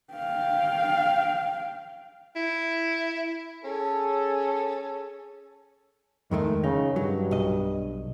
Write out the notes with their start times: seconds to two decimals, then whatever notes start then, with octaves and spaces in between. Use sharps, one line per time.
0.14 F5 G5
2.36 E4
3.64 C#4 G#4 A4
6.31 F2 D#3 G#3 A3
6.64 C#3 D#4
6.96 G2 F#3
7.31 B1 D#5